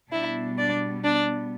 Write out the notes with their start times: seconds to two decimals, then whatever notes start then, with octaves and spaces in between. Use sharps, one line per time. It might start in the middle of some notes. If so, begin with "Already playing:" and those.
0.11 B2 G3 B3 D4 E4 E5
0.58 D4 D5
1.04 D4 D5